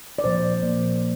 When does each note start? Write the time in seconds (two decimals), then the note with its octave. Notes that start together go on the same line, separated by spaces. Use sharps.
0.19 D5
0.24 A#2 F3 A#3 C5
0.63 A#2 F3 A#3